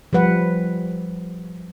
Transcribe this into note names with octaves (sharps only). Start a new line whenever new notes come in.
F3 G3 B4 F#5